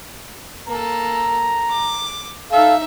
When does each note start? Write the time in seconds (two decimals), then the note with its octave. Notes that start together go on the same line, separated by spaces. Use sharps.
0.68 A#3 A4 A#5
1.70 D6
2.52 D#4 A4 E5 F5